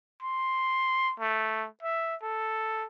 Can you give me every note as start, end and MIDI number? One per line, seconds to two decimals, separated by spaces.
0.23 1.14 84
1.19 1.67 57
1.83 2.16 76
2.22 2.86 69